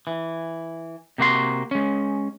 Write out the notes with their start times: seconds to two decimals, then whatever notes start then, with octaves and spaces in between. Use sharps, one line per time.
0.07 E3
1.18 C3 A#3 F#4 C6
1.71 G#3 C#4